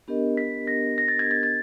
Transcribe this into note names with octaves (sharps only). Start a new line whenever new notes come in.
B3 D4 G4 A#4 D#5
B6
A#6
A#6
A6
G#6
A6
A6